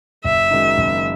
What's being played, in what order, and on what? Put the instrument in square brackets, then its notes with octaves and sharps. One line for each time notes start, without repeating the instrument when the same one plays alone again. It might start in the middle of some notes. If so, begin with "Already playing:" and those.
[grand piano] F#1 [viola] E5
[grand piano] F#2 D#3 G#3 D#4
F#1